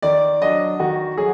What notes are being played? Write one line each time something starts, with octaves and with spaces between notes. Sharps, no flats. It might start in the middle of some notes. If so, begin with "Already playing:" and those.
D#3 D5
F#3 D4 D#5
D#3 F#4
F#3 G#4